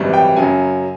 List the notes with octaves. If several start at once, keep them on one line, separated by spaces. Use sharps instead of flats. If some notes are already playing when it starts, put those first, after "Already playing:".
Already playing: G#1 F#2 C#3 E3 G3
G5
F#2 C#3 F#3 G#5